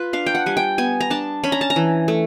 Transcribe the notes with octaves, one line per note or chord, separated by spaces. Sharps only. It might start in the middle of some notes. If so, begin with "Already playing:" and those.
Already playing: F4 B4
D4 F5
G5
F#5
G3 G#5
G5
B3 G#5
A#5
D4 A5
C#4 B5
A#5
A5
A#5
E3
A3